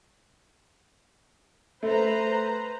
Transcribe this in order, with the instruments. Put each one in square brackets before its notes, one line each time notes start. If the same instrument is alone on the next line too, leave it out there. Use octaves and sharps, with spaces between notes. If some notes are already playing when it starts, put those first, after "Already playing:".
[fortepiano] A3 [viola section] B4 C5 A#5